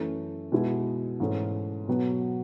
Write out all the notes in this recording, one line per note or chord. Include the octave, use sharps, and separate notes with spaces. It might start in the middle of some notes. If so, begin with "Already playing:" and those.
Already playing: F#2 E3 A3
B2 G#3 B3 E4
G#2 E3 A3 C#4
B2 F#3 B3 F#4